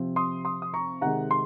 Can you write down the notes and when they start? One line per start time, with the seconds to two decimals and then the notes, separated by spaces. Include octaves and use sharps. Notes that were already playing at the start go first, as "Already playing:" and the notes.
Already playing: C3 F3 C4
0.16 C6 D#6
0.45 C6 D#6
0.62 D#6
0.74 A#5 C#6
1.01 C3 D#3 G#3 F#5 A#5
1.31 C6